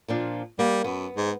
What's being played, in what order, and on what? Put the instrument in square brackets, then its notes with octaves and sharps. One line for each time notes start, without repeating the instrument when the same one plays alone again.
[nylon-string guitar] A#2 F3 D4
[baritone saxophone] G3 [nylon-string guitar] A#3
[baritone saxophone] F#2 [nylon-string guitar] B3
[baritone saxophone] G#2